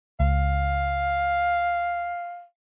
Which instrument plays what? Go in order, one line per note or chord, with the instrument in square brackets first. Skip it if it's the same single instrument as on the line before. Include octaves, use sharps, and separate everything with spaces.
[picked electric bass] C#2 [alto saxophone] F5